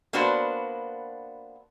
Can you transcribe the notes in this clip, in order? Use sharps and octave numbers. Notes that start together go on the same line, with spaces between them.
A#3 B3 D4 F#4 B4 C5